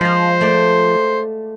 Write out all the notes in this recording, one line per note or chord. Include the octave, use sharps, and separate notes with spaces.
F3 G#3 F4 C5
A3 D5